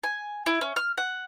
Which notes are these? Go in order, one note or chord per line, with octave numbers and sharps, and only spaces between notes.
G#5
E4
C#4
F6
F#5